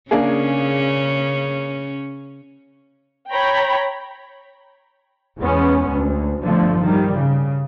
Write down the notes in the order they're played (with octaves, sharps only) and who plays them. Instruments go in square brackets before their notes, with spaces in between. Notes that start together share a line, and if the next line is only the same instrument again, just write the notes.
[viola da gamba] C#3 C#4 [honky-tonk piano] A#3 D4 G#4
[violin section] C#5 G5 A#5 B5
[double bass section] E2 G#3 B3 C#4
D2
G1 D3 F3 A3
D#3 G3
C#3